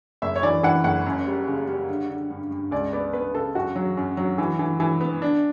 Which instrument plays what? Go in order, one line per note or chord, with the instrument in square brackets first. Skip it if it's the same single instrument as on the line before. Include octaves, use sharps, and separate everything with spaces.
[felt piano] F#1 [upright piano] E5
[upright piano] C#5
[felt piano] E3 [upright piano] D5
[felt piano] E3 [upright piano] F#5
[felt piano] F#1 [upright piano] F#5
[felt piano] F#2
G3
C#3
G3
D3
D3
G2
G2
[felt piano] C#2 [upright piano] D5
[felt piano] B3 [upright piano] D5
[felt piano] B3 [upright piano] B4
[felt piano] C#3 [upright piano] A4
[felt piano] F#2 [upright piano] F#4
[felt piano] F#3
F#2
F#3
E3
E3
E3
B3
[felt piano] D3 [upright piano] D4